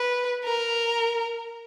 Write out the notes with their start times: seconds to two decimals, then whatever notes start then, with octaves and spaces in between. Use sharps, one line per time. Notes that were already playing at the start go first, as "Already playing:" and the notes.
Already playing: B4
0.45 A#4